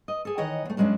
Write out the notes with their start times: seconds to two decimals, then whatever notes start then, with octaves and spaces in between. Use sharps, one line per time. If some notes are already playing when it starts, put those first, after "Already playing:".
0.08 D#5
0.25 G#4 A4
0.38 D#3 E3 C#5 D#5 F#5
0.65 E2 A3
0.77 G2 F#3 G#3 A#3 C#4 D4